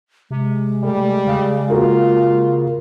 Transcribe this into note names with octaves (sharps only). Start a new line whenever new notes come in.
C3 G#3
G3 A3
C#3 F5
A#3 F4 F#4 A#4